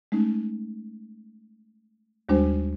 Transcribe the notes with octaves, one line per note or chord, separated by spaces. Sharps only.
G#3 A3 C#4 D#4
D#2 G3 G#3 D4 F#4 C5